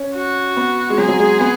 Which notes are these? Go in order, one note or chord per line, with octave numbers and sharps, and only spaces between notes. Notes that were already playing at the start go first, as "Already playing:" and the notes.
Already playing: C#4
F#4
B3
G#3
F#3 G#4
F#3
G#3
B3